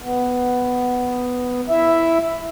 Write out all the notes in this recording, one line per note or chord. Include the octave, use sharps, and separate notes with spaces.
B3
E4 E5